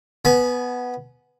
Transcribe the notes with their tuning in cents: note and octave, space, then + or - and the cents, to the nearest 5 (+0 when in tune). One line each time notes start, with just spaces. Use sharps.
B3 +0 G#5 +25 B5 -20